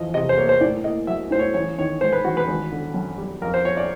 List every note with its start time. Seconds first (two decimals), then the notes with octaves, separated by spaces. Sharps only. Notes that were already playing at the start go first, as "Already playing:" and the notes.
Already playing: E2 F3 D#5
0.14 C3 D#5
0.29 C5
0.38 A#3 C#5
0.49 C5
0.61 A2 D5
0.84 A#3 D#5
1.07 F#3 E5
1.31 A2 C5
1.39 C#5
1.54 A1 C#5
1.78 D#3 C#5
2.01 G#2 C5
2.13 B4
2.24 A1 F#4
2.37 B4
2.48 G#1
2.72 D3
2.94 F#2
3.18 G3
3.42 F2 A#4
3.54 C5
3.65 F3 C#5
3.77 D5